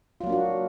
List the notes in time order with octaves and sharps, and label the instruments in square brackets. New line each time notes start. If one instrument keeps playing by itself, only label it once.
[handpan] F4
F#3
A#3
D4
F#4